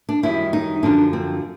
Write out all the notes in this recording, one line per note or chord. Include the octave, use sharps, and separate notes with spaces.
D4
F#2 D#3 G3 E4
D#4
F#2 D3 F3 D4
C4